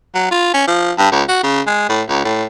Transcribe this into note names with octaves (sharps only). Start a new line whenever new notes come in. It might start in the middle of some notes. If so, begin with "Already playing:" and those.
F#3
F4
C#4
F3
G2
C#2
F#4
C#3
G#3
A2
C#2
A2